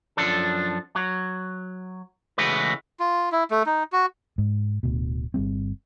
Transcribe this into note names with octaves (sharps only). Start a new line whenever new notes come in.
F#2 F3 D4 A4
F#3
C#3 E3 G#3 A3 F#4 B4
F4
E4
A3
D#4
F#4
G#2
D1 D2 B2
G1 G3 C4